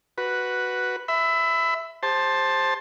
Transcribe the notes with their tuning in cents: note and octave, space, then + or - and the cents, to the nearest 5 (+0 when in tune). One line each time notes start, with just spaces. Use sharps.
F#4 +0 B4 -5
E5 +0 B5 +25
G4 +45 C5 +15 A5 +0